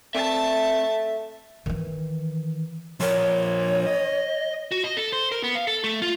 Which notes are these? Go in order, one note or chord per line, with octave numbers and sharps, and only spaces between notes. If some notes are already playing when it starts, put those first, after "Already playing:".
A3 C4 D5 E5 A5
D#3 E3
F3 A#4 C#5
D#5
F#4
D#5
A4
C5
A#4
B3
F5
A4
A3
F4